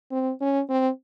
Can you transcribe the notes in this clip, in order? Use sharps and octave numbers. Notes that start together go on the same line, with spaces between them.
C4
C#4
C4